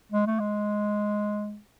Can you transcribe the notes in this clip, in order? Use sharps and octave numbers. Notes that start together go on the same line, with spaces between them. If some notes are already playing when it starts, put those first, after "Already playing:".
G#3
A3
G#3